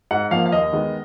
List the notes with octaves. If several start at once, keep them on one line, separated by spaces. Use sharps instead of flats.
G#2 F#5
F3 A#3 F5
F5
D#2 D#5
D#3 G#3 B3